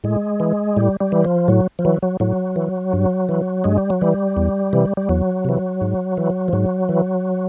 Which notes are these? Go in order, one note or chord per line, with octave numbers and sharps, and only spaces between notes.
A2 G#3
E3
A2 G3
G3
E3
F3
A2 F#3
F3
E3 F#3
F#3
A2 F#3
E3
G2
E3
G2 G#3
G3
F#3
E3 G3
E2
C3 E3
G3
E2 F#3
C3 E3
G#2
E3
F3
G#2 F#3
E3